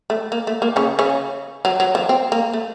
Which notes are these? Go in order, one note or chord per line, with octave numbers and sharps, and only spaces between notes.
A3
A#3
A3
A#3
C#3 C#4
C#3 C#4
F#3
F#3
F3
C4
A#3
A3